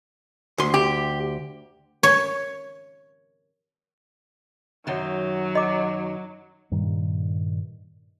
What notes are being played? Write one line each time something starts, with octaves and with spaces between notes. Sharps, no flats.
D2 C6
G4
C#5
F#2 D#3 F#3
D#5 D6
G2 A#2 D#3 G3